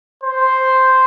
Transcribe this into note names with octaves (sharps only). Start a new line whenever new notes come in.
C5